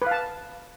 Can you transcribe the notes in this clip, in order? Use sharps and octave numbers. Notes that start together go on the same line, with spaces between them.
B4 F5 A5